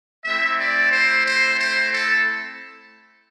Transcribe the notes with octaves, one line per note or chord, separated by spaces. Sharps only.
A3 C4 E4 E5
D5
C5
C5
C5
A4